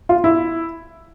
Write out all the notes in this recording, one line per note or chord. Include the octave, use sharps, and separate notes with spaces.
F4
E4